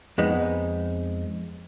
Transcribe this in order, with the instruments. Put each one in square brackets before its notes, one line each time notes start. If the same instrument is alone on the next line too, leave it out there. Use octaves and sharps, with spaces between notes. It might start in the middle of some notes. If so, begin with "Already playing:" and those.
[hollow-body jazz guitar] F2 G#3 B3 D#4